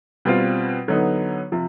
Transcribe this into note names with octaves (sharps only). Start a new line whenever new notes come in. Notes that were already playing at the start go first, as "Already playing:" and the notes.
B2 G3 C4 F4
D3 F#3 B3 D#4
C3 F3